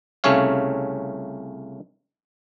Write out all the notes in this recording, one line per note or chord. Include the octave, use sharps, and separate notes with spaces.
C2 C#3 A3 C#4 C#5 F5